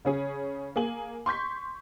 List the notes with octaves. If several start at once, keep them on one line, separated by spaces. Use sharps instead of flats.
C#3 C#4 G#4
A#3 G#4 G#5 F#7
C6 C#6 G6 B6